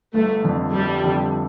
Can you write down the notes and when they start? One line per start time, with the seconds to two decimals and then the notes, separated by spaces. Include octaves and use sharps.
0.14 G1 A3
0.44 F2 D3
0.73 G1 G3
1.03 F2 D3